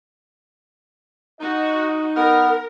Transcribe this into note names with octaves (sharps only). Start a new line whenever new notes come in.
D#4 F#4 D#5
B3 A#4 F6